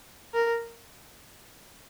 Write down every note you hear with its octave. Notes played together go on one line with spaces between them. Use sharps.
A#4